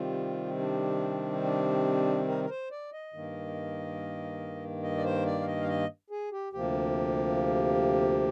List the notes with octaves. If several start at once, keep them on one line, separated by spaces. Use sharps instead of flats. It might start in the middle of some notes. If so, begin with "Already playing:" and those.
Already playing: C3 D#3 G3 C4 F4
D4
D4
A#4
A#4
C5
D5
D#5
G2 D#3 A#3
D#5
D5
C5
D5
F5
D#5
F5
D#5
G#4
G4
D2 C3 F3 A#3 G4